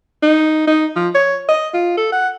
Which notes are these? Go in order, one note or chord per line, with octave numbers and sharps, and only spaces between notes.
D#4
D#4
F3
C#5
D#5
F4
A4
F#5